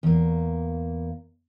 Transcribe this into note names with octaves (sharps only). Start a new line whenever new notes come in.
E2 A#3